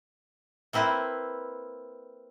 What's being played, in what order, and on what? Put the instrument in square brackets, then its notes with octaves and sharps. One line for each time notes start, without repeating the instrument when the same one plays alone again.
[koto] A#3 C4 E4 B4 E5